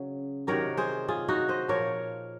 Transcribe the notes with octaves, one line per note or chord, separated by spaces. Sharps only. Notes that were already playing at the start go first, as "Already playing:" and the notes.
Already playing: C#3 F#3
C3 D#3 F#3 A#4 C#5
G#4 C5
F4 G#4
D#4 F#4
C5 D#5
A#2 F3 A#4 C#5